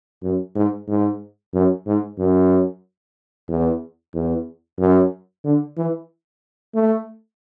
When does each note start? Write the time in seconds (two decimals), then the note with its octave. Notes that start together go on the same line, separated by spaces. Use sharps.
0.23 F#2
0.55 G#2
0.88 G#2
1.54 F#2
1.86 G#2
2.19 F#2
3.48 E2
4.14 E2
4.79 F#2
5.44 D3
5.77 E3
6.75 A3